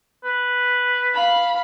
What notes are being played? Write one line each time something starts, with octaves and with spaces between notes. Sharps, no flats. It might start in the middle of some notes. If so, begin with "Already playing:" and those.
B4
F5 B5